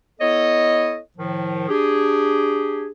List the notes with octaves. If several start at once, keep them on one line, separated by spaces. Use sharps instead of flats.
B3 E4 A4 C#5 D#5
A2 D#3 F3
D4 G4 G#4